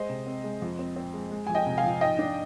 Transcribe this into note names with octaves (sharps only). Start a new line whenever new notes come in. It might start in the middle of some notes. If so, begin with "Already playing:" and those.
Already playing: G#3 C5 D#5
C3
C4
G#3
F2
C4
C4
G#3
G#3
F2 G#5
D#5 G5
C3
F5 G#5
F3
G#2 D#5 G5
D4